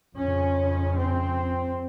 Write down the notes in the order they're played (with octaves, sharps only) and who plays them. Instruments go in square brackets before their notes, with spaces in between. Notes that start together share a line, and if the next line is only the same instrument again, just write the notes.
[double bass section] F2 C#3 C#4
C4